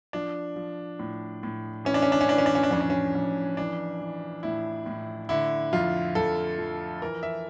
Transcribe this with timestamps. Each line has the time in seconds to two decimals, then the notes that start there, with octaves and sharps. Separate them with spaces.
0.13 F3 D4
0.56 F3
0.99 A2
1.43 A2
1.85 E3 C#4
1.94 D4
2.02 C#4
2.12 D4
2.21 C#4
2.29 E3 D4
2.38 C#4
2.46 D4
2.55 C#4
2.63 D4
2.71 F2 C#4
2.81 D4
2.90 C#4
3.15 F2
3.57 E3 D4
4.00 E3
4.43 A2 E4
4.86 A2
5.29 D3 E4
5.73 F2 F4
6.15 F2 A4
6.58 F3
7.02 E3 A#4
7.23 E5